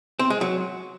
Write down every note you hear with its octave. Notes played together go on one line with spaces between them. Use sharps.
C4
G#3
F#3